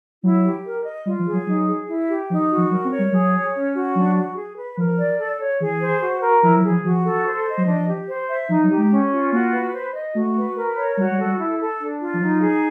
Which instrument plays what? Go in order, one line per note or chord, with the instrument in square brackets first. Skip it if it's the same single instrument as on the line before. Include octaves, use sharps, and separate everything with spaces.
[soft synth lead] F#3 [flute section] E4
[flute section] G4
A#4
D#5
[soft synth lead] G3 [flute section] F4
[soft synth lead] F3
[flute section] G#4
[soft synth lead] F#3
[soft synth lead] F#3 [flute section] D#4
[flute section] G#4
E4
G4
[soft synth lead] F3 [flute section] D#4
[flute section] F#4
[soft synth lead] F3
[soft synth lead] F#3 [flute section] A#4
[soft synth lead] C4
[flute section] C#5
[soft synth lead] G3
[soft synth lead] F#3 [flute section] G#4
[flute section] C#5
C#4
F#4
[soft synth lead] F#3 [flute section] D4
[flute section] F#4
G#4
B4
[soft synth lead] F3 [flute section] A#4
[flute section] D5
A4
C#5
[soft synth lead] E3 [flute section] G#4
[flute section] C5
F#4
A#4
[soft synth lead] F3 [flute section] E4
[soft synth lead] F#3
[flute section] G#4
[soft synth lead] F3
[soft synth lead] F3 [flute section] F#4
[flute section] A4
C5
D#5
[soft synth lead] F#3
[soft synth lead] F3 [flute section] D4
[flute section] G4
C5
E5
[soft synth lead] F3 [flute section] D#4
[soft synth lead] F#3
[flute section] G4
[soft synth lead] G#3
[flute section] C#4
F4
[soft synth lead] A#3 [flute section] F#4
[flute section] B4
C5
D#5
[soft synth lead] A3 [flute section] F#4
[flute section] B4
A#4
C#5
[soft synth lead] G3 [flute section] F#4
[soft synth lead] G3
[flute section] A4
[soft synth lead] G3
[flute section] E4
A4
D4
F4
[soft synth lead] F3
[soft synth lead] F#3 [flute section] D#4
[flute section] G#4